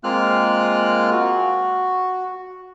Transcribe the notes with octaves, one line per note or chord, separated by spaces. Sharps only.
G#3 A#3 C4 F4 F6 F#6
F#4